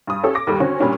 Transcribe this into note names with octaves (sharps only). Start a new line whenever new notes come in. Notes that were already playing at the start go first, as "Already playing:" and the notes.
G2 D#6
C#4 G4 A4
D6 A#6
D#2 G3 A4
D3 C4 C#4 F#4
A#2 G3 C#4 D4